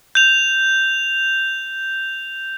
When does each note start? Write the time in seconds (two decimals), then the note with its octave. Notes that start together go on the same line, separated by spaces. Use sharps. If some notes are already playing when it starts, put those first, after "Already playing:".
0.15 G6 F7